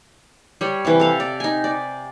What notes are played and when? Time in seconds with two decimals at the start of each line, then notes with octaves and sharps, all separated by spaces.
0.61 G3 C#5
0.85 C3 E3
1.00 A4 F5
1.20 D5
1.40 D#4 G#5
1.64 D5